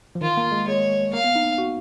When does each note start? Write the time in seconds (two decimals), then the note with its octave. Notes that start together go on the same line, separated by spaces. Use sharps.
0.15 F3
0.21 D#3 F4
0.37 A#3
0.52 G#3
0.67 G#3 C#5
1.13 A#3 F5
1.24 B3
1.36 D#4
1.58 F#4